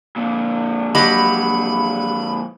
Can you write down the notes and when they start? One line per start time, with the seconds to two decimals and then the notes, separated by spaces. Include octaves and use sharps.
0.16 F2 A#2
0.95 F#3 G4 D#5 B5